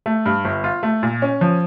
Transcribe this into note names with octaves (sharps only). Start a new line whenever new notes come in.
A3
G2
G1
F4
A3
A#2
C#4
F3